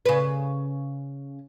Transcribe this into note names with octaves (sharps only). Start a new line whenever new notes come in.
C#3 B4